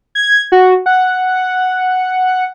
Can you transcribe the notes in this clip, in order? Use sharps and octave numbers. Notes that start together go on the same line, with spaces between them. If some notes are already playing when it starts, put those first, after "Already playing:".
G#6
F#4
F#5